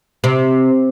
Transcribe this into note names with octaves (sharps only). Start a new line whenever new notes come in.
C3